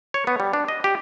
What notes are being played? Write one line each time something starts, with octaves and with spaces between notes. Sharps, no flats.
C#5
B3
G3
D4
D#5
G4